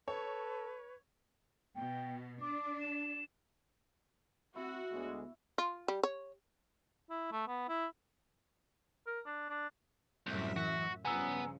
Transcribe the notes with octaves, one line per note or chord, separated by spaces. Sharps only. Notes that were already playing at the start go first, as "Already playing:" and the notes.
A4 B4 C#5
B2 G5
D4 D6
E7
C4 E4 F#4
D2 G#3 B3
F4
G3
C#5
E4
A3
B3
E4
A#4
D4
D4
C2 F#2 A2 E5
E3 F#4
G2 C#3 F3 B3 G#5 A#5 E6